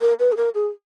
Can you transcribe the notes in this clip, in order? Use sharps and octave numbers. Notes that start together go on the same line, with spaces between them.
A#4
B4
G#4
A#4
G#4